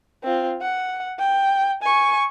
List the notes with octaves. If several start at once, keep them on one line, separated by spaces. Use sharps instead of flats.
C4 F4
F#5
G5
G#5 C#6